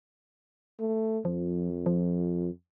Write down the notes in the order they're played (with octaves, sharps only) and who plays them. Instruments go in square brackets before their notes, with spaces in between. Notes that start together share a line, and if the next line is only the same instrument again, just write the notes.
[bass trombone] A3
[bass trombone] F2 [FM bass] F3
[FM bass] F3